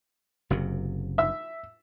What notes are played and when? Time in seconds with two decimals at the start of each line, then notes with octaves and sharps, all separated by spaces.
0.50 F#1 F#2 C3
1.18 E5 E6